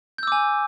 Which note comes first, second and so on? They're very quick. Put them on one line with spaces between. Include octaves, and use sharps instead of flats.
G6 E6 D6 G#5